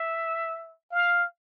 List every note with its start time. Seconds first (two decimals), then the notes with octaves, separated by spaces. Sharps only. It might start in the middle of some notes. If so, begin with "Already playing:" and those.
Already playing: E5
0.91 F5